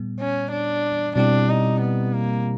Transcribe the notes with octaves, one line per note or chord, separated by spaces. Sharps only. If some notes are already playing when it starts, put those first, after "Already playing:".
Already playing: A#2 G3 B3
C#4
D4
B2 G3 C4 D4 E4 G4
D#4
B3
A#3